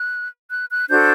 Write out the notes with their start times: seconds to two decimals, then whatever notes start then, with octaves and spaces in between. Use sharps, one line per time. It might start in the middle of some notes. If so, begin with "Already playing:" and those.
Already playing: F#6
0.51 F#6
0.71 F#6
0.90 D4 F#4 A4 C5 G6